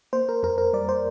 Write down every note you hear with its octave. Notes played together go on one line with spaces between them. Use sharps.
A#3 C5
A#4
F2 A#4
A#4
G3 D5
C5